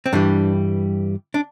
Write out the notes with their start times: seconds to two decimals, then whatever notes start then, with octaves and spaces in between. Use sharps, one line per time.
0.06 C4
0.13 G2 E3 G3 D4
1.34 D4